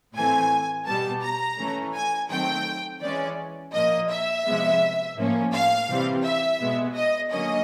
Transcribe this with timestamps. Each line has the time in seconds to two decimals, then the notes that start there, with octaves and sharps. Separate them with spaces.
0.15 A2 E3 A3 C4 G#5
0.86 B2 G3 B3 A5
1.22 A#5
1.59 E3 A3 C#4
1.94 G#5
2.30 D#3 F#3 A3 C4 G5
3.01 E3 G#3 C#4 D5
3.73 A#2 F3 A#3 D#5
4.10 E5
4.45 C3 F3 G#3 B3
5.16 A2 F3 A#3 C#4
5.53 F5
5.88 C3 E3 G3 C4
6.24 E5
6.60 B2 G#3 B3
6.95 D#5
7.31 D3 F#3 A#3 C#4 D#5